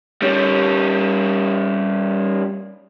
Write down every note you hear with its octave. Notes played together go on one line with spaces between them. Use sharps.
G3 C#4